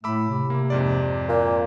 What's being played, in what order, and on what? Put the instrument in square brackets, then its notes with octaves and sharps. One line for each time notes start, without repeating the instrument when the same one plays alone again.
[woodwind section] A2 A3 [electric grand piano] B5 D6 E6
[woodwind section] C3
[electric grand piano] A#3
F2 G#2 D5
[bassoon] A#2